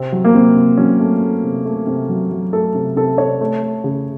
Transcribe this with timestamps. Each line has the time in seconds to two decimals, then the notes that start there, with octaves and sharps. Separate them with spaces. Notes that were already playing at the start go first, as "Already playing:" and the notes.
Already playing: C3 C4
0.12 F#3
0.25 A#3
0.34 C3 C4
0.56 C3
0.77 F#3 C#4
1.00 A3
1.21 A3
1.43 C3
1.65 A3
1.87 C3
2.09 F#3
2.31 F#3
2.53 A3 A4
2.75 C3
2.96 C3 A4
3.18 C3 C#5
3.41 A3
3.63 A3
3.84 C#3